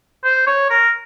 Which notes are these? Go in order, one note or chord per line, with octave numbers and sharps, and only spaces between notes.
C5
C#5
A#4